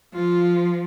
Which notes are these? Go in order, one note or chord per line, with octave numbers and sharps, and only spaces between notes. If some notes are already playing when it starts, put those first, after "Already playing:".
F3 F4